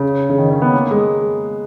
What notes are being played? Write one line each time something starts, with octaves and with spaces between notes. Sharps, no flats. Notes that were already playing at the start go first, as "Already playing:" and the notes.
Already playing: C#3
C#3
D#3
C#4
B3
A#3
G#3